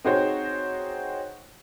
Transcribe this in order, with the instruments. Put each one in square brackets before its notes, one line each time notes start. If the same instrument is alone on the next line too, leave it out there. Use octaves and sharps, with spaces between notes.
[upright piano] C4 D#4 F#4 G#4 C5 C#5